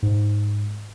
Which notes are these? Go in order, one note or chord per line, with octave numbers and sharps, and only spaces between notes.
G#2